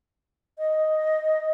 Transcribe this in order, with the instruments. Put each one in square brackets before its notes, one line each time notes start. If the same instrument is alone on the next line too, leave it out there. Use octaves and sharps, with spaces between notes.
[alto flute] D#5